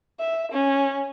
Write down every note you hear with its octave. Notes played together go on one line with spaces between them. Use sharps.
E5
C#4